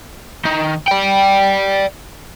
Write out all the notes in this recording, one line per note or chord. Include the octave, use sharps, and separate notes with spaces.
D#3
D5 G5